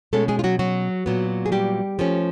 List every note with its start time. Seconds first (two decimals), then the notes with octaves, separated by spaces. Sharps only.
0.13 B2 G#3 A3 C#4 A4
0.28 G#3 G#4
0.39 F4
0.44 F#3 F#4
0.59 F#3 F#4
1.06 A#2 F#3 B3
1.46 G#4
1.52 G3 G4
1.99 F3 A3 C#4